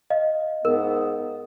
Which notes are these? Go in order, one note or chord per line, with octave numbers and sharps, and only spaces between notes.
D#5 F5
G#2 B3 A#4